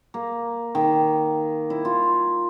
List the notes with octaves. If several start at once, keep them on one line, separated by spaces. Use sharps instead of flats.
A#3
D#3
E4
F4